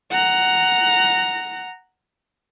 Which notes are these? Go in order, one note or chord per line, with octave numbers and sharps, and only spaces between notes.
F#5 A#5